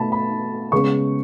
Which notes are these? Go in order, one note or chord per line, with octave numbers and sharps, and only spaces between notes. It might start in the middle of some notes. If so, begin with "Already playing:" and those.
Already playing: B2 A3 A5 B5
B5
C#3 G#3 B3 C#6